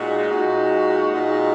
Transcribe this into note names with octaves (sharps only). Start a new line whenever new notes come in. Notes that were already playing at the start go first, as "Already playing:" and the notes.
Already playing: A#2 G#3 D#4 F#4
A#2 G#3 D#4 F#4
A#2 G#3 D#4 F#4